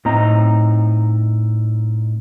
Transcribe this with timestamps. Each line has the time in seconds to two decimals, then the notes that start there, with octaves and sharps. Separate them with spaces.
0.05 A2 C4 D#4 D#5 A#5